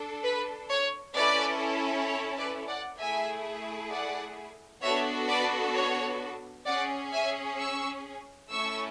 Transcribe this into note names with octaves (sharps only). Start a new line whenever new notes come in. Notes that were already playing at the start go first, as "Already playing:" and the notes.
Already playing: D4 A4
B4
C#5
C#4 E4 A4 B4 D5
C#5
B4 D5
D5 F#5
A3 E4 G#4 E5 G#5
D5 F#5
B3 D4 F#4 A4 C#5 E5
B4 D5
C#5
C#4 G#4 D5 F#5
E5 G#5
C#6 E6
A3 C#4 E4 A4 C#6 E6